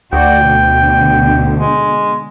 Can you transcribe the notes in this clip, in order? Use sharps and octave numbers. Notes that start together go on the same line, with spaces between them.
D2 F#4 D5 G5
B2 D3
G#3